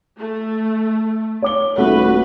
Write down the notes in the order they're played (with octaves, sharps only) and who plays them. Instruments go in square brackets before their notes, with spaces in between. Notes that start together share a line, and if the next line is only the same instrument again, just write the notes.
[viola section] A3
[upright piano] C#5 D6 G7
[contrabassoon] D#1 [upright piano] A3 [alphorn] F#4 [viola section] B4